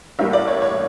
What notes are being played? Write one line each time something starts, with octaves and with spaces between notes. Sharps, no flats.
A1 A2 G3 A#3 E5
D5
C#5
C#5